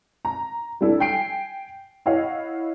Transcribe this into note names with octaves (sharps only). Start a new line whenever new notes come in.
A#5
G3 D4 E4 A4
G5 G#5 C7 D7
E4 C#5 D#5 F5 F#5